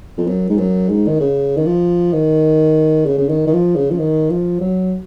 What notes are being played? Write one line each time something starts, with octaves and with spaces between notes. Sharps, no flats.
F2
F#2
G#2
F#2
G#2
D#3
C#3
D#3
F3
D#3
C#3
C#3
D#3
D#3
F3
C#3
F3
D#3
F3
F#3